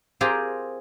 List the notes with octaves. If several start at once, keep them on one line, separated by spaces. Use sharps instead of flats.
C4 F4 G4 G#4 A#4